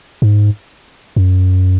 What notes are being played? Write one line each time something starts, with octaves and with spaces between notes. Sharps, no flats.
G#2
F#2